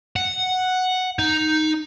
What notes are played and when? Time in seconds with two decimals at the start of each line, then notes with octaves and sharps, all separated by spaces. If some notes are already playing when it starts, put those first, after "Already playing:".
0.16 F#5
1.19 D#4